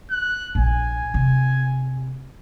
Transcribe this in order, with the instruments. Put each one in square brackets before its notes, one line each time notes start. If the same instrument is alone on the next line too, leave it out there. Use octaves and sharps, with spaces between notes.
[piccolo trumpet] F#6
[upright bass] A#1 [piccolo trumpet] G#5
[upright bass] C3